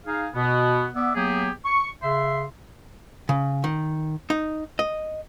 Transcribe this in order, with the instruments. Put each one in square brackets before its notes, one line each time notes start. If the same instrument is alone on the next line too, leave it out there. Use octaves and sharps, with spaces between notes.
[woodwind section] D#4 G#4 F5
B2 B3
B3 D5 E5
F#3 A#3 B3 G4 G#4
C#6
C#3 E5 C6
[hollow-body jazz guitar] C#3
D#3
D#4
D#5